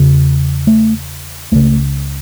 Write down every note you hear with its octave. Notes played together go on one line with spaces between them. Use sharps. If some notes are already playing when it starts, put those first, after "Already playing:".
Already playing: E2 C#3
A3
C#2 C#3 A3